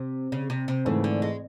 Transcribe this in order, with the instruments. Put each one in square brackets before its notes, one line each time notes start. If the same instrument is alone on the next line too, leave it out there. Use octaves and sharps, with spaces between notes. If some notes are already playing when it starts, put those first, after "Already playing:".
Already playing: [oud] C3
C#3
C3
C3
[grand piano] G#2 E3 A3 [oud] C#3
[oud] D3
G#3